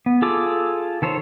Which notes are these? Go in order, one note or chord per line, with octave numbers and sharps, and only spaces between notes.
B3
F4 G#4 A4 D6
D#3 A4 C5 C#5